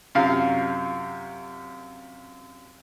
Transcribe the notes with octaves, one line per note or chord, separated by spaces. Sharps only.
F#2 C3 F4 F5